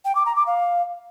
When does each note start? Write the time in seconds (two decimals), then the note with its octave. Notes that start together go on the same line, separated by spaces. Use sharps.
0.05 G5
0.15 D6
0.26 A#5
0.36 D6
0.47 F5